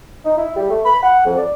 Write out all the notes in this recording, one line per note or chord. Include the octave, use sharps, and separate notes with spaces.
D#4
E4
G3
A3
B5
F#5
F2
D5